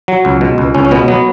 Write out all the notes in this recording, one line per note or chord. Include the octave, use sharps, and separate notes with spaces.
F#3
C#2
B2
C#2
C#2 C#4
C#4
B2 B3
F#3 B3